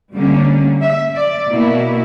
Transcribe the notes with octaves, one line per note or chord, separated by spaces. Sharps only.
D3 G3 A#3 C#4
E5
D5
B2 A#3 E4